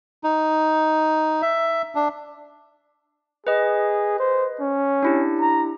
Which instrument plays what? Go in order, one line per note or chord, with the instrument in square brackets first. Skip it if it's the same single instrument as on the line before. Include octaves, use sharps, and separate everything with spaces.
[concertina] D#4
E5
D4
[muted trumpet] G#4 [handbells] B4 D#5
[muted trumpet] C5
C#4
[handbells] D4 E4 G4
[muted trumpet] A#5